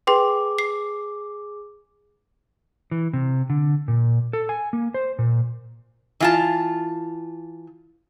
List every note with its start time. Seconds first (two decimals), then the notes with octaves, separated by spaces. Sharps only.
0.07 G#4 B4 G5 C6 D6
0.59 C7
2.91 E3
3.13 C3
3.50 D3
3.88 A#2
4.33 A4
4.49 G#5
4.73 A#3
4.94 C5
5.19 A#2
6.20 E3 F4 A5